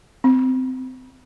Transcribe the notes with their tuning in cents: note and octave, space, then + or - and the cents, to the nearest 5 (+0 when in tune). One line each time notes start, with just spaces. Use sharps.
C4 -20